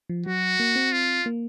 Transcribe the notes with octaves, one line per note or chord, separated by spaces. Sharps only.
F3
F#3 F#4
A#3
C4
F4
A#3